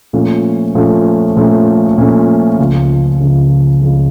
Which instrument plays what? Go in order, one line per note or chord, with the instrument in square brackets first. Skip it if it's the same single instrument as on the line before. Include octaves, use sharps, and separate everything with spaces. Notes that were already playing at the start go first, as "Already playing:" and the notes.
[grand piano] A#2 F3 A3 C#4
A#2 F3 A3 C#4
A#2 F3 A3 C#4
A#2 F3 A3 C#4
C#2 C#3 F3
C#2 C#3 F3
C#2 C#3 F3